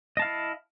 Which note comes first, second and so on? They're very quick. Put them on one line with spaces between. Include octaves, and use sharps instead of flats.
D#5 A5 F5 E4